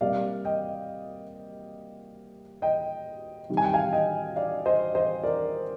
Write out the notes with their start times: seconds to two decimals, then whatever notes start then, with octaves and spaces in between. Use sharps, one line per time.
0.01 C3 G3 A#3 D5 F5
0.45 D#5 G5
2.62 D#5 G5
3.49 C3 D#3 G3
3.57 G#5
3.65 G5
3.74 F5 G#5
3.93 D#5 G5
4.36 D5 F5
4.66 C5 D#5
4.95 C5 D#5
5.23 A#4 D5